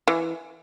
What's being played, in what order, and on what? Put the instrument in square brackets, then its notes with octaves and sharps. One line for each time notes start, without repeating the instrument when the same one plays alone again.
[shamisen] E3